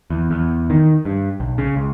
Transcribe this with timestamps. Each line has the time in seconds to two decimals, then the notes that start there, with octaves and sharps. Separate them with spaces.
0.10 E2
0.31 E2
0.70 D#3
1.05 G2
1.40 B1
1.58 C#3
1.76 C#2